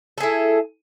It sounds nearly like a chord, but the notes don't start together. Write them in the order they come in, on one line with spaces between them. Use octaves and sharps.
A4 G#4 E4